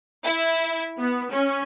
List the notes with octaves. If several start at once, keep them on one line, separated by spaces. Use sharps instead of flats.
E4
B3
C#4